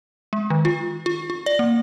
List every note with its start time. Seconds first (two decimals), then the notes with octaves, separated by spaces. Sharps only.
0.33 G#3
0.50 D#3
0.65 F4
1.06 F4
1.30 F4
1.46 D5
1.59 A#3